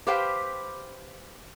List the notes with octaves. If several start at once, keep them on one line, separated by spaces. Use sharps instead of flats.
G4 B4 C5 F5 G5